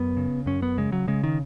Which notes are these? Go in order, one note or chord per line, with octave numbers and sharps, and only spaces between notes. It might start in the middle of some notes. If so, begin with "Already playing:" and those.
Already playing: F#2 B3
C#3
F#2 C#4
B3
C#3 G#3
F#3
C#3 G#3
D#3